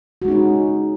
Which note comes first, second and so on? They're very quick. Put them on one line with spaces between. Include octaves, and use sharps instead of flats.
F#4 G#3 D#4 C#4